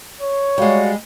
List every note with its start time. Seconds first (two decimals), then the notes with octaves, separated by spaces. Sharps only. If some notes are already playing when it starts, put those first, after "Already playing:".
0.21 C#5
0.58 G3 G#3 F#4 D5 F5